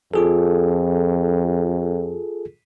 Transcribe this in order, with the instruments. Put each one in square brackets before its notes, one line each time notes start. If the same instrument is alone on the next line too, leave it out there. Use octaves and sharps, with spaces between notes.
[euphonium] F2 [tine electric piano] F4 G#4 A4